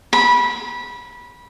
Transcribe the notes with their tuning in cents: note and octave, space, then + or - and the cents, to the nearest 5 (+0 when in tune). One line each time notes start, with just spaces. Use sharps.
B5 -20